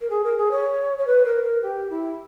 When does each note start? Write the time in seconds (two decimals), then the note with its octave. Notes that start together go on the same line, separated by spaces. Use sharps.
0.01 A#4
0.09 G#4
0.23 A#4
0.37 G#4
0.51 C#5
0.98 C#5
1.06 B4
1.25 A#4
1.43 A#4
1.62 G4
1.89 E4